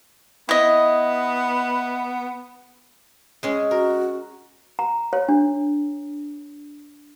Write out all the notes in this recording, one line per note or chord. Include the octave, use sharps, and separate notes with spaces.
B3 E4 D#5
G#3 C#4 G#4
F#4 A#4
A#5
C#5
D4